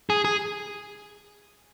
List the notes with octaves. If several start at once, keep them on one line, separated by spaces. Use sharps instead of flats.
G#4
G#4